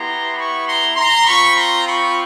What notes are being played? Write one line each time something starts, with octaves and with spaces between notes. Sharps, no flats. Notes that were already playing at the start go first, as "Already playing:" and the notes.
Already playing: B3 E4 G4 A#5 C6
B5 C#6
A#5 C6
A#5 C6
C4 F4 B5 C#6
A#5 C6
B5 C#6